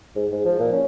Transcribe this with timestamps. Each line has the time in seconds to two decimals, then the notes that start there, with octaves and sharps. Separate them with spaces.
0.16 G#2
0.32 G#2
0.45 F3
0.60 A#2
0.73 C#4